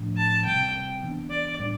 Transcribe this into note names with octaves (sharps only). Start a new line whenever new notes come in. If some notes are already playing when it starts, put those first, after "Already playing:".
Already playing: A2 F3 A3 D4
A5
C3 G3 C4 G5
E3 B3 D4
D5
A2 G3 D4